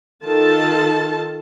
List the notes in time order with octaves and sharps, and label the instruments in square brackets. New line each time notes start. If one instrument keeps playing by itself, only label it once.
[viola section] D#3 F4 A4 A5